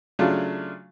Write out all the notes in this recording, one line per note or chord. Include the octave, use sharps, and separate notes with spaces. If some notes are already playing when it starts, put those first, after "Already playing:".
C#3 F#3 A3 D4 F4